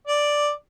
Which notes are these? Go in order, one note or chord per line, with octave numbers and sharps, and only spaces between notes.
D5